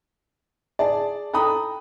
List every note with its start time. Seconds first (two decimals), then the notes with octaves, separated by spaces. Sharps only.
0.79 G#4 D5 A5
1.33 A4 G5 A#5 B5 D#6